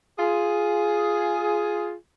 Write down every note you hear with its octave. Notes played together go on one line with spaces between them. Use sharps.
F4 G#4